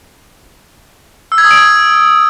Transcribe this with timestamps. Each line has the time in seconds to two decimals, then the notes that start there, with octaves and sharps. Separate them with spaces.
1.32 E6
1.38 G#6
1.44 D#6
1.51 D7
1.57 G#6